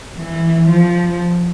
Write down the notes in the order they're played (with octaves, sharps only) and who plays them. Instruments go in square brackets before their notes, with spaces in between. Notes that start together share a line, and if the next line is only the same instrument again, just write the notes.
[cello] E3
F3